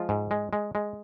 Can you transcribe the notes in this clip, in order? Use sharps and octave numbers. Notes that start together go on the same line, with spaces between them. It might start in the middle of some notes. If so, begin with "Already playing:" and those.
Already playing: F3 G#3 F4
G#2
G#3
G#3
G#3